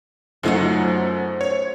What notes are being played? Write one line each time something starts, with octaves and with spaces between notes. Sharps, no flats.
F#2 F#3 A3 D#4 F4 C5 F#5
C#5